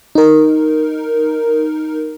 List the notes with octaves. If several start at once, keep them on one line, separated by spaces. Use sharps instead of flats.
D#4 A#4